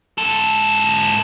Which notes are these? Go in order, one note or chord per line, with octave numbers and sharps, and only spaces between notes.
G#2 A4